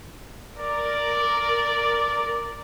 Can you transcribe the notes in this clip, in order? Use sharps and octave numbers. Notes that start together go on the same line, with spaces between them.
A#4 D5